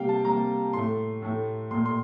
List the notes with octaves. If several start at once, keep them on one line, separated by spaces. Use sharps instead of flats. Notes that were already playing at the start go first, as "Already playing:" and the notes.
Already playing: C3 G3 A#3 F5 G5
A5
C3 G3 A#3 A#5
A2 A3 C6
A2 A3
A#2 A3 C6
C6